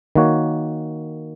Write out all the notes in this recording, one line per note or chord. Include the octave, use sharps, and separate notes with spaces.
D#3 A#3 F#4 C#5